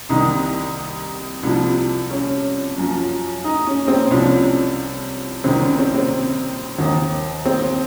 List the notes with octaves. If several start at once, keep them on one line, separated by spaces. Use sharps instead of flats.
C2 C3 D#3 D#4
C2 C3 F3
C#4
F#2 F3
D#4
C#4
C4
C2 C3 F3 C#4
C2 C3 D#3 C4
C#4
C4
C4
D#2 D#3
C4